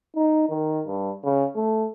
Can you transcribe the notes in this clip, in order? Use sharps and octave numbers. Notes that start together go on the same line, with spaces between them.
D#4
D#3
G2
C#3
A3